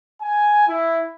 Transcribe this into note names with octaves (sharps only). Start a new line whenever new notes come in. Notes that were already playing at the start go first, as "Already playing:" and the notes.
G#5
E4